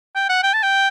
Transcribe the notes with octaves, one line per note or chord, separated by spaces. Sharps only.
G5
F#5
G5
A5
G5